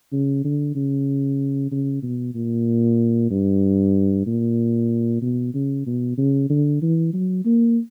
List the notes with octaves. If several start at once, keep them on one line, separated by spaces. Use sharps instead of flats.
C#3
D3
C#3
C#3
B2
A#2
G2
A#2
B2
C#3
B2
C#3
D3
E3
F#3
A#3